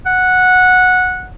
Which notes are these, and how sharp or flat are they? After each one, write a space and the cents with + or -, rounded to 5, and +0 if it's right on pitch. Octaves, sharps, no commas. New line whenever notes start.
F#5 -10